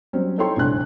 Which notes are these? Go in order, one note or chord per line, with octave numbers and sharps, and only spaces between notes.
F#3 G3 C4 C#4
D#4 E4 A4 C#5 G5 C6
F1 A#1 G2 G#5 F#6